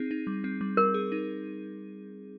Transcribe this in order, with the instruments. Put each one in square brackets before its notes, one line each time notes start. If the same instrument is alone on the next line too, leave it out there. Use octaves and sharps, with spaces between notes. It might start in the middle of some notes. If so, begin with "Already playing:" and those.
Already playing: [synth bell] C4 D#4 G#4
D#4
G3
C4
G3
[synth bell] G3 [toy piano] A#4
[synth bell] G#4
D#4